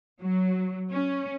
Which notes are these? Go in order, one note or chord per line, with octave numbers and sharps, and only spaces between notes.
F#3
C#4